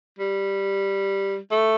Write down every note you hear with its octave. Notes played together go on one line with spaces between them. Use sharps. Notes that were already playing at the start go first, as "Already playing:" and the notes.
G3
A3